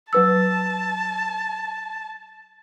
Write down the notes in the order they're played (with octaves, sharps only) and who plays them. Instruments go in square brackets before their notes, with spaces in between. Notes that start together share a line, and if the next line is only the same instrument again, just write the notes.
[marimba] F#3 B4 E6 [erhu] A5